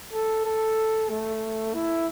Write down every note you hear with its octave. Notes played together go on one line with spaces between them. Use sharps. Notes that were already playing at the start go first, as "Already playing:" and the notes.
A4
A4
A3
E4